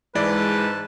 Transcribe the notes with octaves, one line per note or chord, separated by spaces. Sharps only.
G#2 E3 G#3 B4 D5 A5